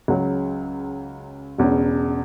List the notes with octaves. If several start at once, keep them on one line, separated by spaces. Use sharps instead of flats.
C#2 C#3 F#3
E1 E2 C#3